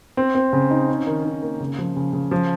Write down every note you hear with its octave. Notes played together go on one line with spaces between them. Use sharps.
C4
C4
C#3
D#4
C#4
D#3
D#3
A#3
C#3
F3
C#3
C#3
F3